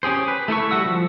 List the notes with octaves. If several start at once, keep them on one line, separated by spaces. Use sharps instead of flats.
C#4 G4 G#4 C5
B4
A3 E4 A4 C#6
G3 F#4 F#5 E6
F3